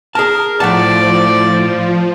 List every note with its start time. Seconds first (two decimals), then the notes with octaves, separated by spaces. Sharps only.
0.15 G#4 A#4 A5
0.60 A2 F3 D5 F#5 A5